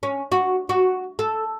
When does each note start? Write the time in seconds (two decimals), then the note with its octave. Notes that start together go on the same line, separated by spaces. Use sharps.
0.03 C#4
0.32 F#4
0.69 F#4
1.19 A4